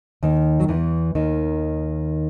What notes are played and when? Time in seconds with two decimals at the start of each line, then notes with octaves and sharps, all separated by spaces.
0.23 D#2 D#3
0.60 F#3
0.68 E2 E3
1.15 D#2 D#3